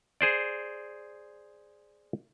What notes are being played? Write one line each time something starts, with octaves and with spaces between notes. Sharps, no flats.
G#4 C5 D5